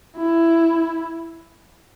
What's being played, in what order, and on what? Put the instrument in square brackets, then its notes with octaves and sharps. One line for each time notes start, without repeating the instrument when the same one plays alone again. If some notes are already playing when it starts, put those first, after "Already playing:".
[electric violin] E4